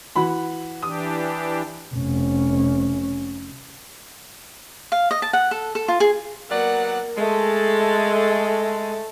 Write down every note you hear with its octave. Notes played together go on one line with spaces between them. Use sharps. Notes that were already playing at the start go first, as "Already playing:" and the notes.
E3 F#4 B5
E3 D4 G4 D#6
F1 C#4
F5
D#5
A5
F#5
A4
A4
F4
G#4
F#3 A#3 B3 D5 F#5
G#3 A3 A4 A5